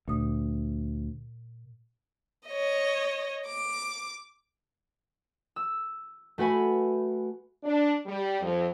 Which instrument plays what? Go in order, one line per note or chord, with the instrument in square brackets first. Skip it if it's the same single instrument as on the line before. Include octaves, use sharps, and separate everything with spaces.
[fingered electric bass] D2 [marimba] A#2 D#6
[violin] C#5 D#5
D6
[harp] E6
A3 F#4 B4 G#5 B5
[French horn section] D4
G3
F2